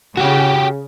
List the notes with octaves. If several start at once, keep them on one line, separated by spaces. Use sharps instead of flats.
C#3 F#4 G4